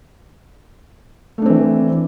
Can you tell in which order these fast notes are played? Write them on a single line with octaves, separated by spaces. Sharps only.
A3 D4 C4 E3